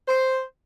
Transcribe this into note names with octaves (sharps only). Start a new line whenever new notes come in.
C5